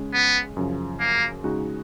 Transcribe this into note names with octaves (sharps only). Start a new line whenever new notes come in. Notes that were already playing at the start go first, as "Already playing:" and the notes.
Already playing: C#3 G#3 C#4
B3
F#2 C#3 F3
A#3
C#3 G#3 D#4 F#4